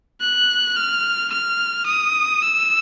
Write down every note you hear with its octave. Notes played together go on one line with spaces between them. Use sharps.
F#6
F6
F6
D#6
E6